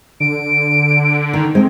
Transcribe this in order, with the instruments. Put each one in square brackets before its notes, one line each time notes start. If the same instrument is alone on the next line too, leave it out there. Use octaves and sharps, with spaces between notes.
[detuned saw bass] D3 [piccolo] D7
[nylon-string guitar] D#3
[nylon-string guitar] G#3 [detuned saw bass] C4